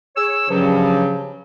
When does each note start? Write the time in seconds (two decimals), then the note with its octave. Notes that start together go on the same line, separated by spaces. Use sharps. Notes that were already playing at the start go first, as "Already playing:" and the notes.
0.16 G#4 C#5 E6
0.50 G2 C#3 F3 F#3